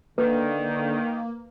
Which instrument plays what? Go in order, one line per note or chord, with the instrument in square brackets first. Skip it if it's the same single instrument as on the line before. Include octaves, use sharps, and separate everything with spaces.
[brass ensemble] D3 [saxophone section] D#3 [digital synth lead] A#3 [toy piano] B4